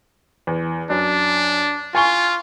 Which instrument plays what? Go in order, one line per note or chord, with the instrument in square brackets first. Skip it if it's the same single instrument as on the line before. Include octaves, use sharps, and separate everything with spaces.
[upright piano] E2
[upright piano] F#2 [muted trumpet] D4
[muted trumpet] F4 [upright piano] G#5 C#6 G7